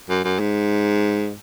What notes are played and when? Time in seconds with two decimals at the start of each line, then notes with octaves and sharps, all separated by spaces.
0.10 F#2
0.24 F#2
0.39 G#2